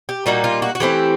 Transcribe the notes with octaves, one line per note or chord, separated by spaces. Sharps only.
G4
A#2 G3 A#3 D#4 F#4
F4
F#4
F#4
E3 A3 C4 E4 G4